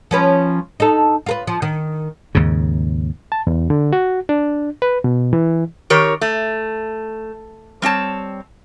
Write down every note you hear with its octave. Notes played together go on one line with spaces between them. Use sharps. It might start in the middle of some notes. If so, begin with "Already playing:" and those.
F3 C#4 B4
D#4 A4
F4 A#4 B4
F3
D#3
D#2 G#2 C#3
A5
E2
D3
F#4
D4
B4
B2
E3
D#3 G4 A#4 C#5
A3
G3 C4 C#5 A5